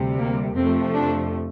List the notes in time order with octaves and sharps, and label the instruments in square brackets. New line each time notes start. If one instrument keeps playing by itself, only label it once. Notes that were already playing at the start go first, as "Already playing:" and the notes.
Already playing: [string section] D2 C3 G3
A#3
F2 C3 F3 A3 C4
D4